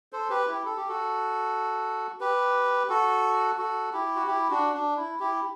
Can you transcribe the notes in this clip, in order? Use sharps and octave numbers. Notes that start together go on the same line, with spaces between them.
A4 C5
G4 B4
E4 G4
A4
G4
F#4 A4
G4 B4
F#4 A4
F#4 A4
E4 G4
F#4
E4 G4
D4 F#4
D4
E4
E4 G4